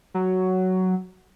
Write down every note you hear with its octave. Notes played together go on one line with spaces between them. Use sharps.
F#3